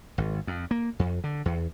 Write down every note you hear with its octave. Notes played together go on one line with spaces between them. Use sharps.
G#1
F2
A#3
F2
D3
E2